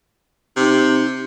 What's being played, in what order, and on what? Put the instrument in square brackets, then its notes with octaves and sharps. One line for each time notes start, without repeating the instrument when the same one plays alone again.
[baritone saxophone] C3 [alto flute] D#4